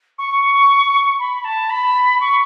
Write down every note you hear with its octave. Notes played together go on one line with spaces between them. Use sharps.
C#6
B5
A5
B5
C#6